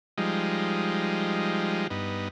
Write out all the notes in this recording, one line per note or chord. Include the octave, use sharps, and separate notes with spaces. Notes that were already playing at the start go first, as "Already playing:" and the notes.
F3 G3 G#3 D#4
G2 B3 D#4